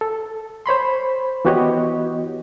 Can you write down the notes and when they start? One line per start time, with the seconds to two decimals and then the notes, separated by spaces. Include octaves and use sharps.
0.01 A4
0.66 C5 C#5 B5 C6
1.45 E3 B3 F#4 G4 C#5 D#5